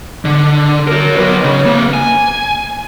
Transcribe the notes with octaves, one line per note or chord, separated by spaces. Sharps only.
D3
F#4 A#4
F#3 B4
C#3
A#3 B4
G#5